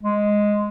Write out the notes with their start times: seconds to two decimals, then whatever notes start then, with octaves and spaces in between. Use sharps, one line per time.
0.03 G#3